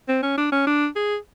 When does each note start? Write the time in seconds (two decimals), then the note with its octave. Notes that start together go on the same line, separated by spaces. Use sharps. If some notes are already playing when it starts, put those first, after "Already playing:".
0.08 C4
0.23 C#4
0.37 D4
0.52 C#4
0.67 D4
0.96 G#4